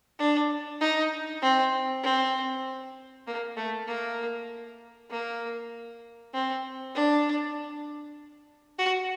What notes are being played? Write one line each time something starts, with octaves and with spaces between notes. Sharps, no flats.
D4
D#4
C4
C4
A#3
A3
A#3
A#3
C4
D4
F#4